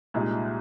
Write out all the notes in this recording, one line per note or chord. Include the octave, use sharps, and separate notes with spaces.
C2 A#2 G#3 D#4